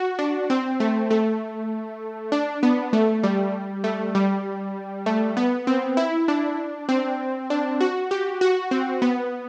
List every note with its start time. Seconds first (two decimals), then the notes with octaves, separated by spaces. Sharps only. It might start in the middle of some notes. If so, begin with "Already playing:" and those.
Already playing: F#4
0.19 D4
0.50 C4
0.80 A3
1.11 A3
2.32 D4
2.63 B3
2.93 A3
3.23 G3
3.84 A3
4.15 G3
5.06 A3
5.37 B3
5.67 C4
5.97 E4
6.28 D4
6.89 C4
7.50 D4
7.81 F#4
8.11 G4
8.41 F#4
8.71 C4
9.02 B3